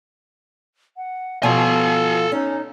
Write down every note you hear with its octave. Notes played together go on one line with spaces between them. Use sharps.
F#5
B2 F3 A4 F5 G#5
C#4 D#4